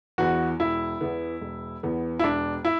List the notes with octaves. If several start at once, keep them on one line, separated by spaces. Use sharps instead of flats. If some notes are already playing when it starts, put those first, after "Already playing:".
E2 E3 B3 F#4
E1 E4
E2 E3 B3
E1
E2 E3 B3
E4
E1 D4
E4